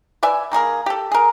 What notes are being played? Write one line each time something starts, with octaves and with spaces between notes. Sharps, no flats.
B4 D5 E5 G#5
D#3 A#3 G#4 A#4
G4 A4
G#4 A#4